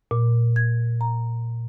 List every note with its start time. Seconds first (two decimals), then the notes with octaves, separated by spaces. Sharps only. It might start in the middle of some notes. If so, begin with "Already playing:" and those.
0.11 A#2
0.56 G#6
1.01 A#5